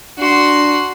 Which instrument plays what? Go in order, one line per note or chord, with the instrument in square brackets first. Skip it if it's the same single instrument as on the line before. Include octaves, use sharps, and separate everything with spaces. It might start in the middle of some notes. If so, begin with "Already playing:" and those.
[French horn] D4 [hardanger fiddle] F#4 C6